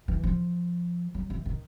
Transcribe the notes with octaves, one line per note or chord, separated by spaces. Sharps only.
E3
F3
F#3
E3
D#3